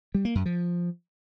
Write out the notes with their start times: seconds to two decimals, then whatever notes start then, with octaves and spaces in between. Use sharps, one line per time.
0.15 G3
0.25 A#3
0.35 F#2
0.46 F3